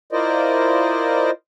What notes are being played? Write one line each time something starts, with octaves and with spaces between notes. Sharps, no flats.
E4 F4 A#4 C5 D5 D#5